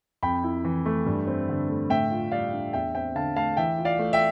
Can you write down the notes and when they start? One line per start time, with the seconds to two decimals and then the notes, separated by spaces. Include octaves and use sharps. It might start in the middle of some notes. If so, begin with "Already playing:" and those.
0.23 F2 G5 B5
0.44 E4
0.64 E3
0.86 A3
1.06 G2
1.27 C4
1.49 D3
1.69 A3
1.90 A2 E5 G5
2.11 F4
2.32 G3 D5 F5
2.53 D4
2.73 E2 E5 G5
2.95 C4 E5 G5
3.15 D3 F5 A5
3.36 A3 F5 A5
3.57 E3 E5 G5
3.79 F4
3.85 D5 F5
3.99 A3
4.13 E5 G5